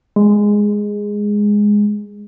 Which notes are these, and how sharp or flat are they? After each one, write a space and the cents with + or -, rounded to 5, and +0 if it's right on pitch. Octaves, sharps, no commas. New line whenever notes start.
G#3 -5